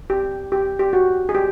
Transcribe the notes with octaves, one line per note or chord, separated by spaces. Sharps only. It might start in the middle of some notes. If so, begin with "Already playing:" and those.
G4
G4
G4
F#4
G#4
G4